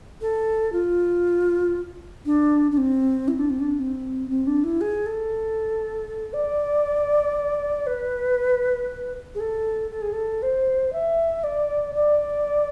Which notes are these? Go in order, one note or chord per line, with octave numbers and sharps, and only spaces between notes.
A4
F4
D4
D4
C4
E4
D4
C4
D4
C4
C4
D4
E4
G#4
A4
D5
B4
G#4
A4
A4
G#4
A4
C5
E5
D5
D5